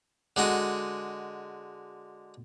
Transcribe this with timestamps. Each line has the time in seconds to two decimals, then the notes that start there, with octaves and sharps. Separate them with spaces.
0.36 D3 G#3 F#4